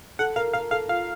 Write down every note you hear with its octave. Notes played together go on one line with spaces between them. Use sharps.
A4 F#5
A#4 F5
A#4 F5
A4 F5
F4 F5